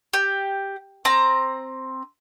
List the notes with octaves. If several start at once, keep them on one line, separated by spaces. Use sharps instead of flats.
G4
C4 A#5